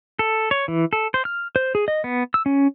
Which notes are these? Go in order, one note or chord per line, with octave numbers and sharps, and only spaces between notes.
A4
C#5
E3
A4
C5
F6
C5
G#4
D#5
B3
E6
C#4